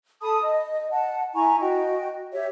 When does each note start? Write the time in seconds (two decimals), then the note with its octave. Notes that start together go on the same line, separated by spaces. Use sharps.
0.22 A4 A5 B5 D#6
0.41 D#5
0.91 F#5 A5
1.35 E4 G#5 A#5 C#6
1.60 F#4 D#5 G5
2.32 G4 C#5 E5